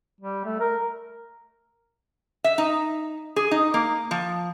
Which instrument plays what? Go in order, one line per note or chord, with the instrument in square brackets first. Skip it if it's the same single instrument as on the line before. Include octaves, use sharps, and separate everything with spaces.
[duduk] G3
A3
A#4
[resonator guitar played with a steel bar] E5
D#4
G#4
D#4
A#3
F3